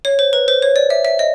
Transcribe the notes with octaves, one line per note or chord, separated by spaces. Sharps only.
C#5
C5
B4
C5
C#5
D5
E5
E5
D#5